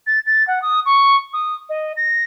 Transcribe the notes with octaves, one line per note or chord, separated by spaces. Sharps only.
A6
A6
F#5
D#6
C#6
D#6
D#5
A#6